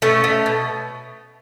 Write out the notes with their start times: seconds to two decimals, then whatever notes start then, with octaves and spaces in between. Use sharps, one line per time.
0.02 B2 A3 C#4
0.24 A3
0.46 B2